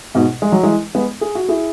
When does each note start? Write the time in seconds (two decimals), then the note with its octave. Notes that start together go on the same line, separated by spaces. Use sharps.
0.15 G#2 B2
0.42 G#3
0.52 F#3
0.63 E3 G#3
0.95 G#3 B3
1.21 G#4
1.35 F#4
1.49 E4 G#4